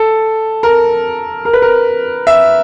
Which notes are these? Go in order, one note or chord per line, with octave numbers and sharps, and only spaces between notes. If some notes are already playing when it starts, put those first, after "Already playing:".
Already playing: A4
A#4
A#4
B4
A#4
E5